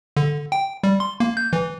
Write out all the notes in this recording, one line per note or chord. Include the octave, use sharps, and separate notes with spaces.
D3
G5
G3
C6
A#3
G6
E3